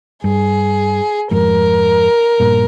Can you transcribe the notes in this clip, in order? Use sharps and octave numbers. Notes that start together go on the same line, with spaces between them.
G2 G#4
F2 G#2 A#4
G2 A#2